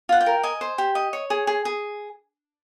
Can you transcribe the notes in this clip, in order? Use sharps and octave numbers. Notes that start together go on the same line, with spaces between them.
F4 F#5
G5
A#4
D#5 G#5
C5
G4
D#5
C#5
G#4
G#4
G#4